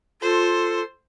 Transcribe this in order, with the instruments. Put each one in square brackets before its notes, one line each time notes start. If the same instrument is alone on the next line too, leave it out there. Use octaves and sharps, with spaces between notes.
[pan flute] F4 [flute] A4 [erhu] C5